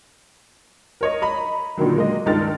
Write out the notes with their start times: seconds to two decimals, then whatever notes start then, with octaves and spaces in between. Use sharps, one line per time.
1.01 A#4 C#5 D#5
1.21 D#5 A#5 B5
1.77 A#2 D3 D#3 F#3
1.95 G#3 A#3 D#5
2.26 C#2 G2 D#3 G#3 F6 A6